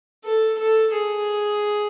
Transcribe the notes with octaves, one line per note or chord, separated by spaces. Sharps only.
A4
A4
G#4